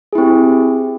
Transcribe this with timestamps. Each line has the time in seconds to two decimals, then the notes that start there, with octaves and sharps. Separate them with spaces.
0.13 G#4
0.15 E4
0.18 C4
0.21 G4